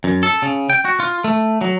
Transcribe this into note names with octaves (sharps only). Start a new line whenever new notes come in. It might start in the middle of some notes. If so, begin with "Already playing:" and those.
F#2
A4
C#3
G5
F#4
F4
A3
F#3